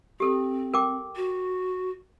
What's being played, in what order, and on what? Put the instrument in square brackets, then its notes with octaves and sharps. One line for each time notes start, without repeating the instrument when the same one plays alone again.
[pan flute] C4 [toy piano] G4 A4
[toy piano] A#4 G5 D6
[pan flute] F#4